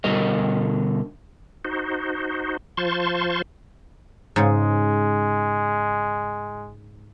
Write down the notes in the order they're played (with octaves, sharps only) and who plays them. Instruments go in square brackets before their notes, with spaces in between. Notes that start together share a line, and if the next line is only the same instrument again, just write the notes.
[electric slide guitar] B2 D3 G3 A#4 D#5
[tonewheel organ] D#4 F#4 C5
F3 F4 C5 A5 C6 C#6
[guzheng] G#2 C#3 [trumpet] G#3